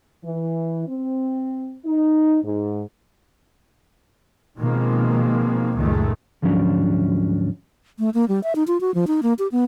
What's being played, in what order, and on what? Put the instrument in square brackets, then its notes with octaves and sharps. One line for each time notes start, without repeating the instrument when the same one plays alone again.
[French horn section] E3
C4
D#4
G#2
[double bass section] B2 D#3 F3 G#3 A#3 C4
C#2 F#2 A#2 D#3 G#3 A3
[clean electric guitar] D2 G#2 F3 F#3 C#4 D4
[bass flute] A3
A#3
G3
E5
D#4
F4
F#4
F3
D#4
A#3
G4
B3